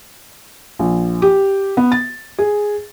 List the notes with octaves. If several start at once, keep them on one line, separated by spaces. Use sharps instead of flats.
A#1
G4
B3
A6
G#4